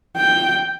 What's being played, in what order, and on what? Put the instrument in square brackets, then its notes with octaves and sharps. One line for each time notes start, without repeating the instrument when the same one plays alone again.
[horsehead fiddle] G5